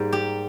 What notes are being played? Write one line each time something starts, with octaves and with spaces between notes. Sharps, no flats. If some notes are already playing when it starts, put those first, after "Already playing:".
Already playing: G#2 G3 A#3
G4